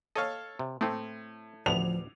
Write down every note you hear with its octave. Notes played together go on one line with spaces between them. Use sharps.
A4 C#5 D#5 F5
C3
A2 A3 C4
A1 D2 F3 B3 F7